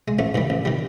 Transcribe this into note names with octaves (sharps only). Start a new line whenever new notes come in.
G#3
A1 A3
G2 D#3 G3
A1
D#3 G3